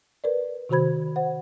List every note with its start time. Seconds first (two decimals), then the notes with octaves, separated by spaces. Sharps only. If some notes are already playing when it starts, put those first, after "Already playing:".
0.24 A#4 B4 D5
0.69 C3 D#3 F#4 C5 B5 G#6
1.16 C5 F#5